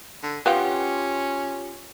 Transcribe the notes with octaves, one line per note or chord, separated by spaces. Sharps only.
D3
B3 C#4 F4 G4 F5 G5 C6